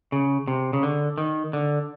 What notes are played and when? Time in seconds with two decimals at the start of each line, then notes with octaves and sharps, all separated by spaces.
0.12 C#3
0.48 C3
0.73 C#3
0.83 D3
1.18 D#3
1.53 D3